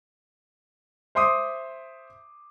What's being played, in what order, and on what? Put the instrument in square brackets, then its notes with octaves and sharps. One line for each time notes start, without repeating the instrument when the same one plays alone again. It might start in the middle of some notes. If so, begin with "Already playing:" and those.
[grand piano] C5 E5 C6 D6 D#6